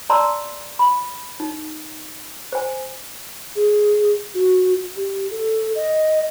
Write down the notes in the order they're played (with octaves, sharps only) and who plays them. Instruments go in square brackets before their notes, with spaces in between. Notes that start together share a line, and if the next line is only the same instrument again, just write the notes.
[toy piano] D5 A5 A#5 C6 E6
B5
D#4
C5 G#5
[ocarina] G#4
F#4
G4
A4
D#5